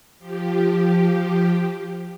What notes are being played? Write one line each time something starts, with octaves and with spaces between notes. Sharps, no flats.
F3 G4